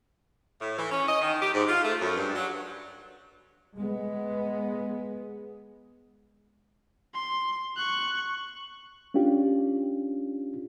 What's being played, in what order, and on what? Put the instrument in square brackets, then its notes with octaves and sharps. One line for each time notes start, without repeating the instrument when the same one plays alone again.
[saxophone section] A2
E3
C#4
D#5
D#3
G4
G#2
F4
A3
F#2
G2
F#3
[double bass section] G#3 B3
[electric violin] C6
C#6 F#6
[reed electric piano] C#4 D4 F4 G4